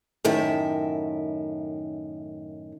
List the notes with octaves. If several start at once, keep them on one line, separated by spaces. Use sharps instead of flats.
F#2 A2 D#3 A#4 E5 A5